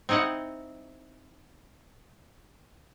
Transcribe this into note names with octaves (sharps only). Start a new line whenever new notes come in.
C4 D#4 E4 D#5 F#5